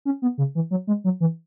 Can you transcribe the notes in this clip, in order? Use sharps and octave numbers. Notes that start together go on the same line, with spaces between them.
C#4
B3
C#3
E3
F#3
G#3
F#3
E3